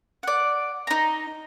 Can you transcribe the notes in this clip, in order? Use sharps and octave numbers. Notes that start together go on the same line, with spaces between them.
D5 F#5
D#4 A#5